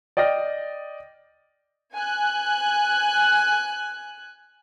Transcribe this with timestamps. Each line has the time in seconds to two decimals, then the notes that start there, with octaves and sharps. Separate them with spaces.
0.17 D5 D#5 G5 F6 A#6
1.95 G#5 F#6